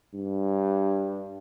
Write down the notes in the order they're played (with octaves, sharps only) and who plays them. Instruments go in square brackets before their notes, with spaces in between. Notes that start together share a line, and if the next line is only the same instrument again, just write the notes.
[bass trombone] G2